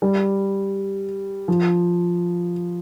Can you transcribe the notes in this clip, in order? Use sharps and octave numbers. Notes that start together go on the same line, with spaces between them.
G3
F3